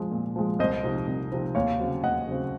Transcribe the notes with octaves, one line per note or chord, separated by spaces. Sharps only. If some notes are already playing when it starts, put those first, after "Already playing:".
Already playing: F3 G#3
A#2
F3 G#3
C2 C5 D#5
C3 F3 C4 D#4
C2
C3 F3 C4 D#4
D#2 C#5 F5
C#3 F#3 C4
D#2 D#5 F#5
C#3 F#3 C4